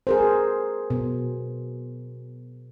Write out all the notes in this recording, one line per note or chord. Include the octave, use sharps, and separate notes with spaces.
G#4 A#4 C5
B2